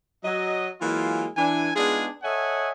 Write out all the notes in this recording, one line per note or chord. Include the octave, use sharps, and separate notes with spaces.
F#3 D#5
E3 F#3 G#3 A#3 F4
E3 D4 G#5
G#3 B3 D4 D#4 F4 G#4
A4 C#5 D#5 E5 F#5 G#5